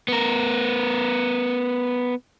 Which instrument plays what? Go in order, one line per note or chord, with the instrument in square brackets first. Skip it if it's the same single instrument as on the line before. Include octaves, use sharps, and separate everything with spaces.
[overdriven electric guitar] B3 A#4